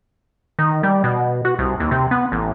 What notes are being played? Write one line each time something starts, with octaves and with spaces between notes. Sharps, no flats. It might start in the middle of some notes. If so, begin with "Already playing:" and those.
D#3
G3
B2
F#4
C2
D#2
C3
B3
A1